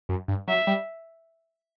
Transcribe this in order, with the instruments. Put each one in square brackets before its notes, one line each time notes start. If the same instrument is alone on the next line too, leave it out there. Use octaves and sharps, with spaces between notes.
[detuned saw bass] F#2
G2
[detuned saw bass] F#3 [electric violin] E5
[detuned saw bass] G3